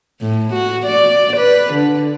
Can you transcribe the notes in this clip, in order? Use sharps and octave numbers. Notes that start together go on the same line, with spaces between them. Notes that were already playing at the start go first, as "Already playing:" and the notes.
A2
F#4
D5
B4
D3